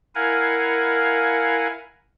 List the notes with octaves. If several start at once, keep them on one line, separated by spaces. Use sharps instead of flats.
E4 A#4 F5 F#5 G#5